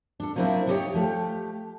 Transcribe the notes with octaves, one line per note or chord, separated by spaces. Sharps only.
D4 A4
F3 F#3 A#3 C4 D4 E4
G3 B3 D#4 E4 G4 C#5
F3 A3 G4